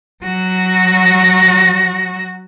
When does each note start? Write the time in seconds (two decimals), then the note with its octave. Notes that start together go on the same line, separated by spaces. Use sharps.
0.24 F#3 F#4